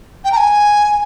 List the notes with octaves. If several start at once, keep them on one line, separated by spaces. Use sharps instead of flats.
G5
A#5
G#5